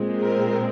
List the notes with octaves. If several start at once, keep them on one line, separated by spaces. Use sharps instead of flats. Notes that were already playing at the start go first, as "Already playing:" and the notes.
Already playing: A#2 G#3 C4
A#4